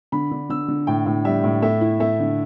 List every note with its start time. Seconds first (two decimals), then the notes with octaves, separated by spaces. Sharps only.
0.12 D3 B5
0.31 D3
0.49 D3 E6
0.68 D3
0.87 A2 G5
1.06 A2
1.25 G3 E5
1.44 A2
1.62 A3 E5
1.81 E4
2.00 A3 E5
2.20 D3